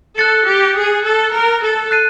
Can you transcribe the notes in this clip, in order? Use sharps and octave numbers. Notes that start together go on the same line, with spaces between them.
A4 F#6 A6 C#7
G4
G#4
A4
A#4
A4
F#6 A6 C7 D#7